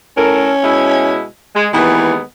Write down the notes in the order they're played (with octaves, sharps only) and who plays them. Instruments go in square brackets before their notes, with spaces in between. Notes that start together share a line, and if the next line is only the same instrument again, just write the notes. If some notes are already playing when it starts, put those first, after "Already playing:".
[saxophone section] A2 A4 A#4 [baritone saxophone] C#4
[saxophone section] B2 G#3 E4
G#3
[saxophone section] D#2 G#3 B3 [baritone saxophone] E3